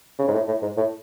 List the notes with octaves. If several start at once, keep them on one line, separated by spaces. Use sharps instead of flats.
C#3
G#2
A2
A2
G#2
A2